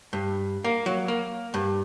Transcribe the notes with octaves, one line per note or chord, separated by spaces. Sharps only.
G2
A#3
F#3
A#3
G2